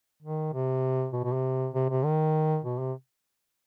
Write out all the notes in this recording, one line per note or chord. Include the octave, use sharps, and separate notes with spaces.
D#3
C3
B2
B2
C3
C3
C3
D#3
B2
C3